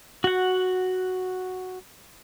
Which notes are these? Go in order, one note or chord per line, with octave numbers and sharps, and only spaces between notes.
F#4 F#5